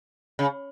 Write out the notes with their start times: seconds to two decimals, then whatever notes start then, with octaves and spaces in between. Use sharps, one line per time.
0.39 C#3